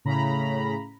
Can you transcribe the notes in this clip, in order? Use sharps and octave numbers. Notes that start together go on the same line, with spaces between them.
A2 C#3 A#5 B5